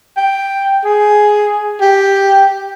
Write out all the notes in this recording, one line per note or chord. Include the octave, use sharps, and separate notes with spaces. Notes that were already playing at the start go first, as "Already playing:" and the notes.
G5
G#4
G4